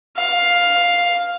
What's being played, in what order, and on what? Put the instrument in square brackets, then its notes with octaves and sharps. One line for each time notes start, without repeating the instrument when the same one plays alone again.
[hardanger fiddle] F5